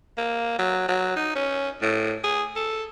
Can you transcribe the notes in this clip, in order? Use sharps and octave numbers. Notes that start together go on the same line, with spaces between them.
A#3
F#3
F#3
D#4
C#4
A2
G#4
A4